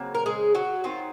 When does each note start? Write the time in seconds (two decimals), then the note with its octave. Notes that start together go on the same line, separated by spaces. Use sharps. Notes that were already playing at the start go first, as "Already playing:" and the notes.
Already playing: C#3 F#3 A#3 C4
0.15 A#4
0.26 G#3 G#4
0.55 F#3 F#4
0.84 D#3 F#3 C4 F4